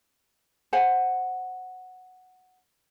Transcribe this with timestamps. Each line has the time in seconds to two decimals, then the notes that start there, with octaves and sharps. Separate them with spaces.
0.73 C5 F#5 G#5